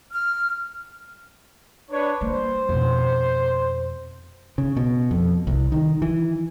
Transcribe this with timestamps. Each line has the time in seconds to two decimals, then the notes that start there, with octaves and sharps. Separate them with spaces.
0.11 F6
1.90 D4 B4 C#5
2.21 G3 A#3 C5
2.69 F2 B2
4.58 C#3
4.76 B2
5.11 F2
5.47 C2
5.72 D#3
6.02 E3